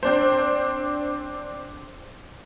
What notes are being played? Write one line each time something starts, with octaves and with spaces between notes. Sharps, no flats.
C4 D4 C5